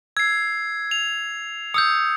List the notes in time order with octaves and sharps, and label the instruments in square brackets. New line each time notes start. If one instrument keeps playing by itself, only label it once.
[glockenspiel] E6 [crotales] G#6 C7
[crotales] F7
[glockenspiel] D#6 E6 G6 [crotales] C#7